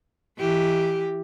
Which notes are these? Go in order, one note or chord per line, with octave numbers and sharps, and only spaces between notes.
E3 G4